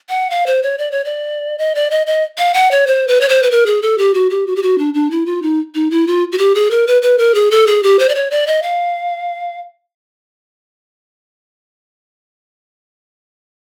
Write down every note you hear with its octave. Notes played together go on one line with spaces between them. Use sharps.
F#5
F5
C5
C#5
D5
C#5
D5
D#5
D5
D#5
D#5
F5
F#5
C#5
C5
B4
C#5
C5
B4
A#4
G#4
A4
G4
F#4
G4
F#4
G4
F#4
D4
D4
E4
F4
D#4
D#4
E4
F4
F#4
G4
G#4
A#4
B4
B4
A#4
G#4
A4
G#4
G4
C5
D5
C#5
D5
D#5
F5